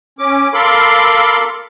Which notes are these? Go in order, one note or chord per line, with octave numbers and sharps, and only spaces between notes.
C#4 D6
A4 A#4 F5 B5 C6 D6